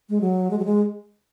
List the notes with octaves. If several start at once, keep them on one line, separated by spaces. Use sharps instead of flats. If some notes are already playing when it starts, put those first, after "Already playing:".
G#3
F#3
G#3
F#3
G#3